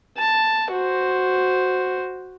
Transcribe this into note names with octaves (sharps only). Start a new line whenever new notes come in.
A5
F#4 C5